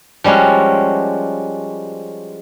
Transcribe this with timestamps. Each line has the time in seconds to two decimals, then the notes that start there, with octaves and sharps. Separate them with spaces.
0.24 F3 G3 G#3 C#4 F#4